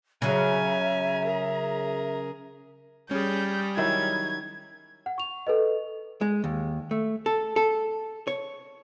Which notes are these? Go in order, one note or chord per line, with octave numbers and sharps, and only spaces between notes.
C#3 F#3 E5 G#5 A#5
G#4 A#4
G3 C#4 G#4 G6
D#3 F#3 E4 G#6
F#5
C#6 F7
A4 B4 D#5
G#3
D#2
A3
A4
A4
C#5